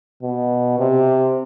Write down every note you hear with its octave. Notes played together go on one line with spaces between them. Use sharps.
B2
C3